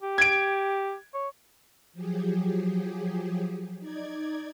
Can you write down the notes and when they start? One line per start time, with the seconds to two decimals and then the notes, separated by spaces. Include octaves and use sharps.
0.03 G4
0.18 G#6 D7
1.14 C#5
1.93 F3 F#3 G4 G#4
3.79 D#4 D5 G#6